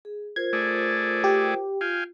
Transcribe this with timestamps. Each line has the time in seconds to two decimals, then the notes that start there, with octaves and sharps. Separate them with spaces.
0.05 G#4
0.36 F4 A#4 C5 G#6
0.53 A3 G#4 D5
1.24 G4
1.81 F4 F5 G5 G#5